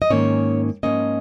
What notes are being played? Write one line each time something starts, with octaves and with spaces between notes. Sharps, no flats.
D#5
G#2 D#3 A#3 C#4 C#5
G#2 F3 A#3 C#4 D#5